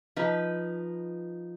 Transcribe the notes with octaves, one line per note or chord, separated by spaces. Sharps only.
F3 D#4 B4